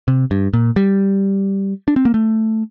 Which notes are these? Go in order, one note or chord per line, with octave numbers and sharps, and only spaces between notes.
C3
G2
A#2
G3
D4
C4
A#3
A3